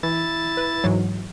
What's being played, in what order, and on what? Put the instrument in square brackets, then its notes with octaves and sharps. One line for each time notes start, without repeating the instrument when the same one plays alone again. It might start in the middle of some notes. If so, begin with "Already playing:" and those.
[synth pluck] E3 [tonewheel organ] E4 A6
[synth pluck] B4
G#2 E3 F#3